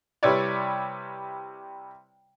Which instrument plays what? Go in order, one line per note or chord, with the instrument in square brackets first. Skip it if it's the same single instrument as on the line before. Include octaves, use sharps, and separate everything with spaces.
[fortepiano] C3 G3 E4 B4 C#5 D5